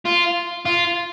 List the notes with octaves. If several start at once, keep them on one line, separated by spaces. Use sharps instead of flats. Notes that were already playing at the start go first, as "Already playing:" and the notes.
F4
F4